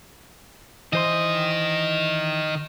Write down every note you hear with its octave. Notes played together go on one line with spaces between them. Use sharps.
D#3 E3 C5 D#5 C6